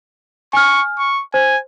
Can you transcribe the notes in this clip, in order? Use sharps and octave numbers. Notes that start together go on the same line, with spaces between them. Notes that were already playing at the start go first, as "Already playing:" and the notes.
G#5 C#6 F6
C#6
C5 G#5